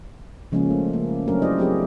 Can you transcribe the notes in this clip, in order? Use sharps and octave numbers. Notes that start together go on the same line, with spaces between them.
C#3 F3 G#3 A#3 C#4
A3
A#3
F#3 A3 C#4 D4 A#4
E4 F#4 G4 C5 D5 D#5
F#3 C4 G4 G#4